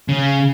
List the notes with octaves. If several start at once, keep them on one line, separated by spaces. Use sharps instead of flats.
C#3